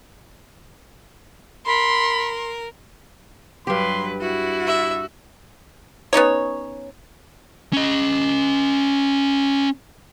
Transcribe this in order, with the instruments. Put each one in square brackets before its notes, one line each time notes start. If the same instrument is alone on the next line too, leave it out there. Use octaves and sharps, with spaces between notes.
[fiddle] A#4 [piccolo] B5 [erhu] C6
[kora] G2 G4 [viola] F#3 B4 [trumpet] C6
[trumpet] E4 [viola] F#4
[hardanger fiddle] E5
[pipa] B3 C#4 D#4 C#5
[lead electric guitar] C#4 D#5